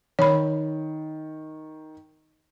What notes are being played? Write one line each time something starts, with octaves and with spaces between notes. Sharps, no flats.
D#3 C#5 B5